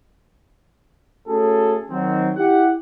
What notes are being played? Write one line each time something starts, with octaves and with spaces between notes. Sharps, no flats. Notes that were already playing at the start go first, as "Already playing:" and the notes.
A3 C#4 F#4 G#4 A4
D#3 F#3 C4
E4 G4 F#5